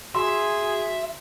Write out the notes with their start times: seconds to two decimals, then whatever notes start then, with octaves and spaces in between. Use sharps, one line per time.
0.15 F#4 G#4 E5 C6